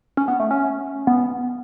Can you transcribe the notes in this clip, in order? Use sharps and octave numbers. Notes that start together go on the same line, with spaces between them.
C#4
B3
A3
C#4
B3